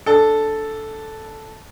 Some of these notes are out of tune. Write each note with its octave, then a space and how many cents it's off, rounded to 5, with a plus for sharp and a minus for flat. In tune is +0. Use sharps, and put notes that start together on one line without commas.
D4 +0 A4 -5